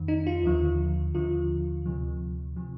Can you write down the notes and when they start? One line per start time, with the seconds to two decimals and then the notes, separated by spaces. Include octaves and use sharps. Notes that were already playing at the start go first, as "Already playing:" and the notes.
Already playing: F2 D#3
0.08 D#4
0.27 F4
0.43 D#2 D3 F3
1.15 D#2 D3 F3 F4
1.86 D2 C3 F3
2.56 C3 F3